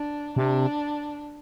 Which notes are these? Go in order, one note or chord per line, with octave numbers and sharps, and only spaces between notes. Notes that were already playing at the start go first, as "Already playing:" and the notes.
Already playing: D4
C3 D4